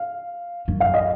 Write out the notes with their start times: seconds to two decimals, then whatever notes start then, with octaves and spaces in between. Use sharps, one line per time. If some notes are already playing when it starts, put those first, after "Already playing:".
Already playing: F5
0.68 F#2
0.80 F5
0.94 D#5